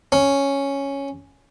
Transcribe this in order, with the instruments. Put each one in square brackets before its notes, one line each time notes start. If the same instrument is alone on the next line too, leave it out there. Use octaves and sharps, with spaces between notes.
[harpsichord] C#4